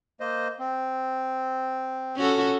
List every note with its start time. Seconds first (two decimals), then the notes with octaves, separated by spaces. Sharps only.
0.20 A#3 C5 D#5
0.59 C4
2.17 C#4 F#4 A4